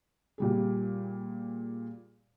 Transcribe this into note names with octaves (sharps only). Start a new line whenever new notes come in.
A#2 G3 G#4